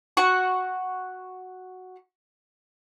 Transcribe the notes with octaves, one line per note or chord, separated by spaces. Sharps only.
F#4 F#5 C#6